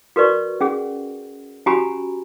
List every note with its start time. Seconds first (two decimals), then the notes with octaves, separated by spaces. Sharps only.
0.16 F#4 A#4 B4 D5 C#6
0.61 C#4 G#4 F#5
1.66 C#4 F#4 G4 G#5 A#5 B5